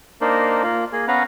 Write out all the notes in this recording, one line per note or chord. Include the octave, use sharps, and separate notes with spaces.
A#3 D4 D#4 A#4 C5
A#3 F4
A#3 G#4
B3 C#4 B4 F5 F#5 A#5